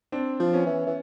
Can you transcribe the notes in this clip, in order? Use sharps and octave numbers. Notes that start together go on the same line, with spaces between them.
C4 D4
F3
B3 C#4
E3
E3